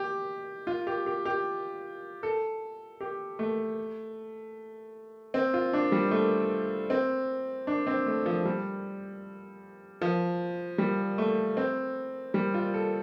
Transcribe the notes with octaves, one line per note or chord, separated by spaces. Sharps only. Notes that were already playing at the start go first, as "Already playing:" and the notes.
Already playing: G4
F4
G4
G4
G4
A4
G4
A3
C4
F4
D4
G3
A3
C4
D4
C4
A3
F3
G3
F3
G3
A3
C4
G3
F4
A4